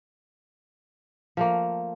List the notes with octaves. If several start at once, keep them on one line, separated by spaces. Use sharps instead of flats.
F3 A3 A#3